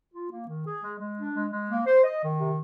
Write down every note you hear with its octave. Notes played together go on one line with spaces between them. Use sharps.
F4
A#3
D#3
G#4
G#3
G#3
D4
G#3
G#3
A#3
C5
D#5
D#3
C3